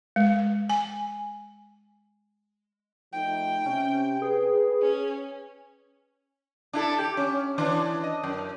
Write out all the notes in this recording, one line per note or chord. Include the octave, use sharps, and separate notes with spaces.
G#3
G#5
F3 A3 D#4 G5
C3 C#4
G#4 B4
C#4
D4 E4 A4
G4
C#4
E3 D4
D#5
F#2